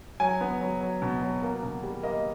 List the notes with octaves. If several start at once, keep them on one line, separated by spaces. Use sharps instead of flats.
F#3 G#5
B3
F#3
F#3
B2
F#3
A#3
B2
G3
A#3 D#5